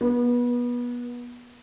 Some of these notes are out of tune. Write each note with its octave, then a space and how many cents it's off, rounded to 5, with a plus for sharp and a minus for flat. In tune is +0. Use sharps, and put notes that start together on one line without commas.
B3 -25